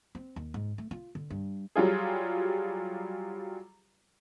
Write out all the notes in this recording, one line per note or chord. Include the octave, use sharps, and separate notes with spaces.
C4
D#2
G#2
A3
F4
D3
G2
F#3 G3 F4 G#4